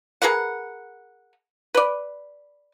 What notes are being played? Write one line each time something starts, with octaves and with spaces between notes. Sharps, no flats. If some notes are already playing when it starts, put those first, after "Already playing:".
G#4 A#4 B4 F#5
B4 D5